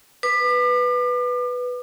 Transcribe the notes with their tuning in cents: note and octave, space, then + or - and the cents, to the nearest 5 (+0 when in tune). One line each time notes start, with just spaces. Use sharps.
B4 +0 D6 +40